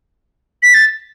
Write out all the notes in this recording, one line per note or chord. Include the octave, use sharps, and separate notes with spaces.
B6
A6